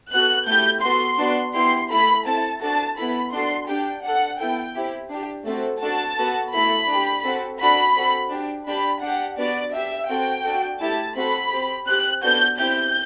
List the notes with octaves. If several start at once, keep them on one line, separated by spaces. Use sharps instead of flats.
B3 F#4 A4 F#6
A3 E4 G4 G6
B3 F#4 A4 C6
B3 D4 F#4
B3 E4 G4 C6
A3 E4 A4 B5
C4 E4 A4 A5
D4 F#4 A4 A5
B3 E4 A4 B5
D4 F#4 A4 C6
D4 G4 G5
D4 A4 F#5
B3 E4 A4 G5
C4 E4 G4
D4 G4
A3 C4 F#4 A4
D4 F#4 A4 A5
B3 F#4 A4
A3 E4 A4 B5
D4 G4
C4 F#4 A4
D4 F#4 A4 B5
C4 F#4 A4
D4 G4
D4 G4 B5
D4 G4 F#5
B3 D4 F#4 D5
D4 G4 E5
C4 F#4 A4 G5
D4 F#4 A4
A3 E4 G4 A5
C4 F#4 A4 B5
C4 G4
C4 G4 F#6
B3 D4 F#4 A4 G6
C4 E4 G4 G6